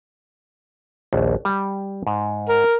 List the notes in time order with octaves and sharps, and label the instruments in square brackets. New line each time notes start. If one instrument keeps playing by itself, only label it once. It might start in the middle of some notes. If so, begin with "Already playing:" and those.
[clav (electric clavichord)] A#1 D#2
G3 G5
G#2
[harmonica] A#4